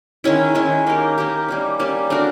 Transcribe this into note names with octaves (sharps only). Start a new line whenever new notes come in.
D#3 G#3 C#4 E4
D#3 G#3 C#4 E4
A#3 D#4 G4 A#4
A#3 D#4 G4 A#4
G3 A#3 C#4
G3 A#3 C#4
A3 D4 F#4 A#4